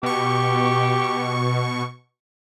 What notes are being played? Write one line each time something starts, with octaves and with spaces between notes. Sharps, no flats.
B2 G4 C#6